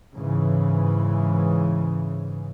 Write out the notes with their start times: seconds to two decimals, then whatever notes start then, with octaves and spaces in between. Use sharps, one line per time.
0.15 G#2 C#3 E3